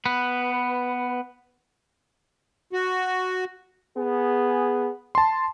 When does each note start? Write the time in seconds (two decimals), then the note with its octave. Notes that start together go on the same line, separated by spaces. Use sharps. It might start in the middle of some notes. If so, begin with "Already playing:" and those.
0.06 B3 B4
2.73 F#4
3.97 B3 G#4
5.15 A5 C6